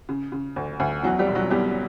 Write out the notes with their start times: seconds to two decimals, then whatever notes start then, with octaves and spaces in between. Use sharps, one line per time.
0.09 C#3
0.32 C#3
0.56 D2
0.80 D2
1.03 E2 F#3 F#4
1.19 G3 G4
1.27 E1
1.35 F#3 F#4
1.50 E2 G3 G4